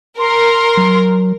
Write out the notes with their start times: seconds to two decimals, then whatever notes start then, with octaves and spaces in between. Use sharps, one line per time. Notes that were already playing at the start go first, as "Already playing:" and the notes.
0.19 A#4 C6
0.77 F#3